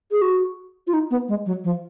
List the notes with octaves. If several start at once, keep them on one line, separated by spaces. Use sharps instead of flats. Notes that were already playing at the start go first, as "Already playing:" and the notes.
G#4
F#4
F4
D#4
B3
G#3
F#3
F3